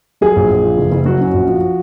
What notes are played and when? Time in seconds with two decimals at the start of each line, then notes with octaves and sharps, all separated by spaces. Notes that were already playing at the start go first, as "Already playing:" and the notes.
0.21 F#3 G#4
0.36 A#1
0.50 A#1
0.64 F3
0.78 F#1
0.92 F#1
1.06 F#3 F#4
1.20 C#4
1.34 A#1
1.48 F3